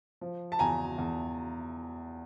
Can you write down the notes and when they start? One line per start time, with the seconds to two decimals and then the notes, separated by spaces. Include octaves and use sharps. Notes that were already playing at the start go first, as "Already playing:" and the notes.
0.21 F3
0.52 A5
0.59 E2 G#5 A#5
0.98 E2